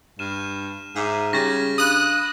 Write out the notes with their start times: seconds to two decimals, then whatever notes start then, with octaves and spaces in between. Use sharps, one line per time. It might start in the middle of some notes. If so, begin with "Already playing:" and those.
0.19 G2 F6 D#7 E7
0.96 G#2 E5 A#5 D6
1.33 C#3 G3 G4 C#6 A6 A#6
1.78 D4 F5 B5 D#6 F#6